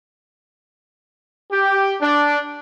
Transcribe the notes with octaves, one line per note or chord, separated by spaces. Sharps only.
G4
D4